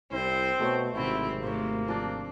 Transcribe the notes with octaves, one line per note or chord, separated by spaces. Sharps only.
C2 C4 E4 C5
B2 A3 C#5
G#1 C3 F#3 C4 E4
G#2 C3 A3 A#3 C5 C#5
F3 C4 D4